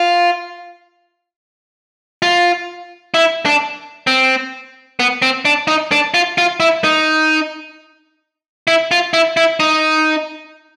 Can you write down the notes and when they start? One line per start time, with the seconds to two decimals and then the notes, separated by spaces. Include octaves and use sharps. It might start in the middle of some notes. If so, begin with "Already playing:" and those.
Already playing: F4
2.22 F4
3.14 E4
3.46 D4
4.07 C4
5.00 B3
5.22 C4
5.45 D4
5.68 D#4
5.92 D4
6.14 F4
6.38 F4
6.60 E4
6.84 D#4
8.67 E4
8.91 F4
9.13 E4
9.37 E4
9.60 D#4